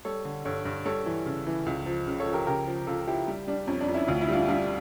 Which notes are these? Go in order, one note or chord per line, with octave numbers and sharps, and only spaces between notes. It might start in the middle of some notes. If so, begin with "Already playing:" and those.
G3 A4 C#5
D3
G2 A4 C#5
G2
G3 A4 C#5
E3
C#3
E3
C#2
F3
C#3
A4 C#5
F3
G4 A#4
C#3 G4 A#4
F3
C#2 F4 A4
F3 E4 G4
G3
G3 D4
F2 C#4
D4
F2
C#4 E4
D2 F4
E4
G3 D4 F4
G3 D4 F4